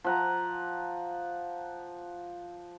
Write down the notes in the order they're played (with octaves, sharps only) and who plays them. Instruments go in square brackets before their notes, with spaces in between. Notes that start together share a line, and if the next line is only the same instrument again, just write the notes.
[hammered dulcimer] F3 F#5 A#5